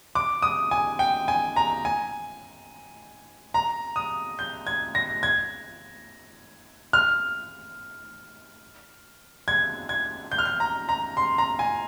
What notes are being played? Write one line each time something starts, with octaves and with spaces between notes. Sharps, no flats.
D6
D#6
G#5
G5
G#5
A#5
G#5
A#5
D#6
G6
G#6
A#6
G#6
F6
G#6
G#6
G6
F6
G6
A#5
A#5
C6
A#5
G#5